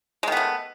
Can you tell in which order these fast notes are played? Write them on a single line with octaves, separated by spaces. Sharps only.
G#3 D#3 B3 A3